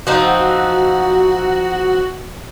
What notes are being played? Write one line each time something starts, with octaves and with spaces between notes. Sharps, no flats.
F3 C4 D#4 F#4